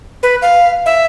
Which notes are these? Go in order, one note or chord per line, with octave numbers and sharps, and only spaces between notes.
B4
F5
E5